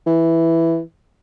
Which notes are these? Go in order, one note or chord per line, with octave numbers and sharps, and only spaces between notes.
E3